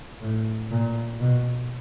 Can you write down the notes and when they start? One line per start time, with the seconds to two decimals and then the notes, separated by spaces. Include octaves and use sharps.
0.21 A2
0.71 A#2
1.20 B2